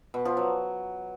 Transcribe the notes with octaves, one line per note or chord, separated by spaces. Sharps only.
B2
F3
F#3